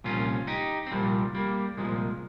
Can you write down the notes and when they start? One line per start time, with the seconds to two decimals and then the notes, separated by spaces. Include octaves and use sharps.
0.04 C2 A#2 F3 C#4 F4
0.47 D#4 G4
0.86 C4
0.92 C2 A#2 F3 G3 A#3
1.34 G3 A#3
1.77 C2 A#2 F3 G#3